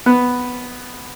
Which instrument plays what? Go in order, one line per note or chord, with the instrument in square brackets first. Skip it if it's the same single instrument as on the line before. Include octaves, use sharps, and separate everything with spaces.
[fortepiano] B3